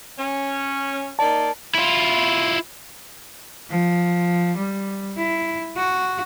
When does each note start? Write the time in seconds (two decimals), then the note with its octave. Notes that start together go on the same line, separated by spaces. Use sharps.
0.17 C#4
1.19 A#3 D#4 D5 A5
1.75 E4 F4
3.70 F3
4.57 G3
5.17 E4
5.77 F#4